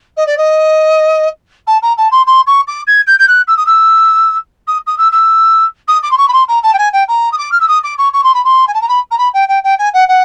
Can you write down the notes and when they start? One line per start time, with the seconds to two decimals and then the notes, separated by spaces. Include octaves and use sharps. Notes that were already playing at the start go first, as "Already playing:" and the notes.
0.17 D#5
0.26 D5
0.37 D#5
1.67 A5
1.82 A#5
1.97 A5
2.11 C6
2.27 C6
2.47 C#6
2.67 D6
2.87 G#6
3.07 G6
3.19 G6
3.27 F#6
3.47 E6
3.57 D#6
3.66 E6
4.67 D#6
4.86 D#6
4.98 E6
5.12 E6
5.88 D#6
6.03 D6
6.11 C6
6.17 C#6
6.28 B5
6.33 C6
6.48 A#5
6.63 A5
6.73 G5
6.78 G#5
6.93 G5
7.08 A#5
7.32 D#6
7.38 D6
7.52 F6
7.60 E6
7.68 D#6
7.83 D6
7.98 C#6
8.13 C#6
8.24 C6
8.34 B5
8.44 C6
8.67 G#5
8.74 A5
8.81 A#5
8.88 B5
9.11 A#5
9.18 B5
9.33 G5
9.48 G5
9.64 G5
9.78 G#5
9.93 F#5
10.08 F#5